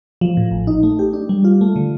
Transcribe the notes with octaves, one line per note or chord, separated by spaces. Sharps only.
F3
A2
A1
D#4
A3
G4
D4
G3
F4
A3
D3